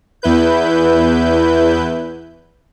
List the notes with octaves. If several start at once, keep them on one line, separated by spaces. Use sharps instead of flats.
E2 E4 B4 G6